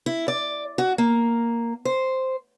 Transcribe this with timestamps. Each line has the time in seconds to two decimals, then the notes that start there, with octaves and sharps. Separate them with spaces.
0.06 E4
0.28 D5
0.78 F#4
0.98 A#3
1.85 C5